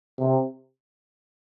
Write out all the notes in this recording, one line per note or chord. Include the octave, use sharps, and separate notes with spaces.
C3